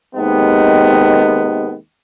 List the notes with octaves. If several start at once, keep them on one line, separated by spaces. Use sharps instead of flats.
D#2 C3 D#3 G#3 B3